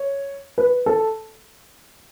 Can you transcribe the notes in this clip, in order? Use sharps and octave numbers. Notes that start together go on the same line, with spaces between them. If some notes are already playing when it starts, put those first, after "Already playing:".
Already playing: C#5
B4
A4